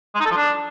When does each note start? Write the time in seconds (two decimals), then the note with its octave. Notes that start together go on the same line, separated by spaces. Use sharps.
0.15 G#3
0.20 D#4
0.25 A4
0.31 F3
0.36 D4